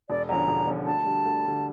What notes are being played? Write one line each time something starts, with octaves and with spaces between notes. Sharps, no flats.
E1 D5
E2 D3 F3 C#4 A#5
E1
E2 D3 F3 C#4
D2 A5
D3 G3
D2
D3 G3